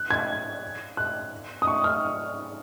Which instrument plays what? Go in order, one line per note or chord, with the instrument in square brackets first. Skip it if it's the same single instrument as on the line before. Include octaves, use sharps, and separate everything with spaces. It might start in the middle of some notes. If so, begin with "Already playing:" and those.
Already playing: [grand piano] F#6
G#6
F#6
D#6
C#6
F6